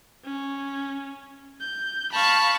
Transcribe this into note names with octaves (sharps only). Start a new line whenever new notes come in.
C#4
G6
F5 A5 B5 C#6